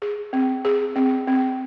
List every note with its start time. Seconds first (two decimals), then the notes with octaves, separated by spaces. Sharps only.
0.02 G#4
0.33 C4
0.65 G#4
0.96 C4
1.27 C4